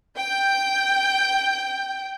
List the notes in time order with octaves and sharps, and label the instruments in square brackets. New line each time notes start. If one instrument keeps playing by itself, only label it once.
[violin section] G5 G6